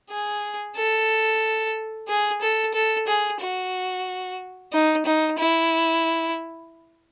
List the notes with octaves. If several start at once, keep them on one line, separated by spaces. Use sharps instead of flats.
G#4
A4
G#4
A4
A4
G#4
F#4
D#4
D#4
E4